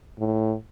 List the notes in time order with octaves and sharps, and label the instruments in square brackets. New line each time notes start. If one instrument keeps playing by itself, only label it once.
[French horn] A2